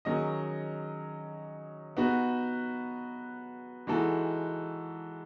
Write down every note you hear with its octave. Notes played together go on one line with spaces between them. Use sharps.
D#3 F#3 C#4 G#4 D#5
B3 D#4 F#4
E3 G#3 D#4 F#4 A4